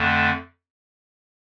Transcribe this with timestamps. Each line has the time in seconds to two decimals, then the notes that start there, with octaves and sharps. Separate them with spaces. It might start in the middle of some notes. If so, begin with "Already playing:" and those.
Already playing: F2 D3 A3